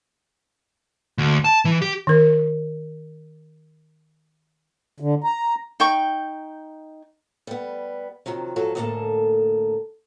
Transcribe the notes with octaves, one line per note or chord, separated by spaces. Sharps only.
D2
A5
E3
G4
D#3 A#4
D3
A#5
D#4 G5 C#6
G3 B3
C3 D#3 F3 F#3
G#2 F3 F#3 F#4 G#4 A4
D2 A2 A#3 G#4 A4 A5